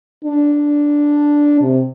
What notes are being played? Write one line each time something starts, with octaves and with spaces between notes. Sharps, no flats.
D4
C3